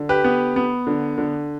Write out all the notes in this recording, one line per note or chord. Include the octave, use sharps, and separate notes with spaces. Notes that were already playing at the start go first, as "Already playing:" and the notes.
Already playing: D3
G4 B4
B3
B3
D3
D3